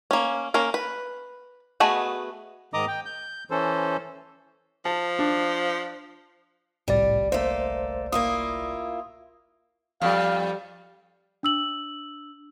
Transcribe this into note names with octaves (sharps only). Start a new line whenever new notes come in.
A#3 C#4
A#3 C#4 A#4
B4
A3 B3 F#4 G#4 D#5
G#2 D#3 D#5 A#5 D6 D#6
G5
G6
E3 C#4 A4 C5
F3 A5
D4
G1 C2 A2 G3 D5
A3 A#3 C5
A#3 E4 F4 D#6
F2 G3 F5
D4 E6 F#7